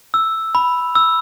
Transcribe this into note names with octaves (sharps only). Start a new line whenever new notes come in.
E6
B5
E6